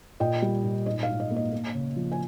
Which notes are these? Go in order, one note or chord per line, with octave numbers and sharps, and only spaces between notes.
A#2 D#5 G5
G3
A#2
G#2 D#5
F5
G#2
D#5
A#3
D#5
A#3
C#3
F3
G#5